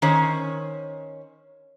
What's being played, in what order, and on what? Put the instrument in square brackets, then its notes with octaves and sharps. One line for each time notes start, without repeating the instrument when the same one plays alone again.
[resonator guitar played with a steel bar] D#3 C#4 C5 C#5